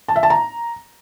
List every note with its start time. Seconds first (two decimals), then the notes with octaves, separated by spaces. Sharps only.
0.08 A5
0.16 E5
0.23 A5
0.30 A#5